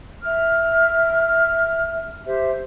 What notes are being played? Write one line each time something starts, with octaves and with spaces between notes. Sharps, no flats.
E5 F6
G4 C5 E5